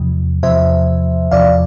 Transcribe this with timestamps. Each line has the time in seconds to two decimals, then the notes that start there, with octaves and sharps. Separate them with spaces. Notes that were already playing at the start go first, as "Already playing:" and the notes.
Already playing: E2 C3 F3
0.43 E2 C3 F3 C5 E5
1.31 E2 C3 F3 D5 F5